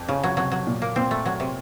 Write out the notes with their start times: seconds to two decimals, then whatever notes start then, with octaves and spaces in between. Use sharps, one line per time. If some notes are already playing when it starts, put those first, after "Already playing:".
Already playing: F2
0.08 C#3 C#4
0.24 F#3
0.37 C3 F#3
0.52 F#3
0.67 A#2
0.82 A#3
0.96 A#2 C4
1.11 A3
1.25 F#3 C#5
1.40 C3